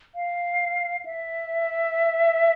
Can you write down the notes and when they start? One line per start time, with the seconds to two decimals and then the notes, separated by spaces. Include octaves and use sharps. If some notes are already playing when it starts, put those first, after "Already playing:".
0.15 F5
1.05 E5